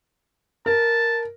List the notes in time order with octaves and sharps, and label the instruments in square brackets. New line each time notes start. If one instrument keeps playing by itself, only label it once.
[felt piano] A#4 [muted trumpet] A5